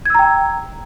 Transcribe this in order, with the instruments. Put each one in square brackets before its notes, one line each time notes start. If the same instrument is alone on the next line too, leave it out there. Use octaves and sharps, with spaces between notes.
[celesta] G#6
E6
A#5
G5